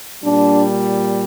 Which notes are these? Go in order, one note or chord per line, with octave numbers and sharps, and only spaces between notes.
A#2 G3 D4